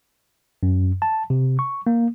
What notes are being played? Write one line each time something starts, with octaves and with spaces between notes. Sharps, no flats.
F#2
A5
C3
C#6
A#3